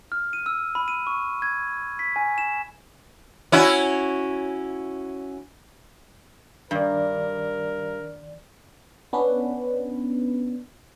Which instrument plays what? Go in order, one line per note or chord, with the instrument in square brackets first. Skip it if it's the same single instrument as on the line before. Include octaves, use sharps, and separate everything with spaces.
[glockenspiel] F6
D#7
E6
B5
D#7
C#6
G#6
B6
G#5
E7
[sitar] C#4 E4 F#4
[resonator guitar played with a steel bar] G2 [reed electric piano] D#3 D5 [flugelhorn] A#4
[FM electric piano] B3 C#4 D4 B4